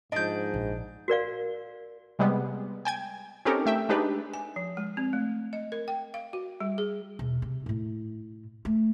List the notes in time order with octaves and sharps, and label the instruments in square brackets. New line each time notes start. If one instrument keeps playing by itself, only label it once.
[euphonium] G#2 [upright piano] F3 D#5 [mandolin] D4 G6
[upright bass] A#1
[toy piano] F#4 A#4 D5 F5
[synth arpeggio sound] C3 G3 G#3 B3
G5 G#5 G#6
C4 C#4 D#4 G4 A4 A#4
A3 E5 G5
G#3 D4 D#4 G4 B4
[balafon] G#5
F3
G#3
C4
A3
D#5
A#4
G5
F5
F#4
G3
G#4
[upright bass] E1
C3
A2 E4
A3